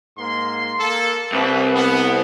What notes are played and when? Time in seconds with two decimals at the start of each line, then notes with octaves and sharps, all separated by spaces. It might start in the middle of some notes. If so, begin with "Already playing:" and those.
0.18 G#2 A#3 C6
0.80 A#3 A4
1.32 C2 B4
1.75 B3